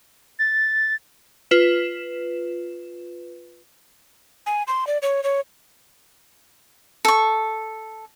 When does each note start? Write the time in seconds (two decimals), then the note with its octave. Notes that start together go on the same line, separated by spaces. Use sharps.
0.39 A6
1.51 F4 B4 E7
4.46 G#5
4.67 C6
4.87 D5
5.02 C#5
5.24 C#5
7.05 A4 C#6